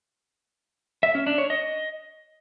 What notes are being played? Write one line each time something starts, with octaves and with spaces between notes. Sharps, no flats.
E5
C#4
D4
C#5
D#5